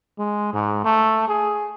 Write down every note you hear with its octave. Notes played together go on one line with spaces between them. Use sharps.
G#3
G#2
A3
G#4